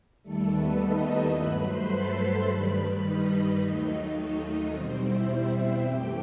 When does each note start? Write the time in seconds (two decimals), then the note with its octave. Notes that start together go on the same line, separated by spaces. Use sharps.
0.23 D#2 D#3 G3 A3 A4
0.51 B3 B4
0.79 D#4 D#5
1.07 E4 E5
1.35 G2 F#3 A3 B4 B5
1.63 C5 C6
1.91 A4 A5
2.47 G2 D#3 G3 B4 B5
3.03 D#4 D#5
3.59 D#2 D#3 F#3 A3
4.71 E2 B2 G3 C4 C5
4.99 E4 E5
5.27 C4 C5
5.55 E4 E5
5.83 F#2 E3 A3 G4 G5